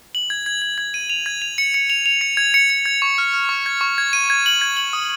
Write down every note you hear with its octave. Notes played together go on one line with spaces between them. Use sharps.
F#7
G#6
G#6
G#6
G#6
D#7
F7
G#6
F7
C#7
C#7
F7
F7
C#7
G#6
C#7
C#7
G#6
C#6
F6
F6
C#6
G#6
C#6
G#6
D#7
G#6
F#7
G#6
F#7
D#6